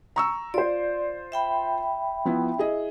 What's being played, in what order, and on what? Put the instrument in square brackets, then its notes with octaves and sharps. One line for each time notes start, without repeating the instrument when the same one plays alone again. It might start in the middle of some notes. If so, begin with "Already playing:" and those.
[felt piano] A#5 C#6 E6
[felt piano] F4 C5 [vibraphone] D5
[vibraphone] E5 G5 B5
[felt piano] F3 B3 E4
E4 G#4 D#5